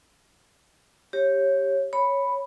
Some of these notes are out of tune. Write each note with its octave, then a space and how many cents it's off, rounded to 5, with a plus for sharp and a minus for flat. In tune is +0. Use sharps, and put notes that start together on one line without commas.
G4 +0 C#5 -15
C#5 +0 B5 +0